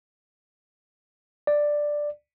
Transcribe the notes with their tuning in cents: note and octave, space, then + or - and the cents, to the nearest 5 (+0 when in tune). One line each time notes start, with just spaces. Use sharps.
D5 +5